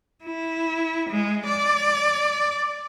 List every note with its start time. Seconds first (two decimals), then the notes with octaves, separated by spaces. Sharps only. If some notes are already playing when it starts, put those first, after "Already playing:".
0.24 E4
1.10 G#3
1.46 D5